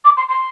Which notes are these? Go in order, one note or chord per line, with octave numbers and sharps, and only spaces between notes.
D6
C6
C6